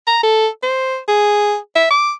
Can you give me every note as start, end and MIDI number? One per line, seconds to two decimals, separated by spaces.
0.07 0.23 82
0.23 0.48 69
0.63 0.98 72
1.08 1.56 68
1.76 1.90 76
1.90 2.13 86